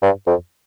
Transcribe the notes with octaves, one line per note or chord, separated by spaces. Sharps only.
G2
F2